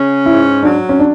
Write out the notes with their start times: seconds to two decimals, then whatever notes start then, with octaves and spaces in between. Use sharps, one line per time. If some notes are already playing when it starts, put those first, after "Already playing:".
Already playing: C#3 C#4
0.25 G#2 E4
0.63 F#3 D4
0.89 C#4
0.99 D4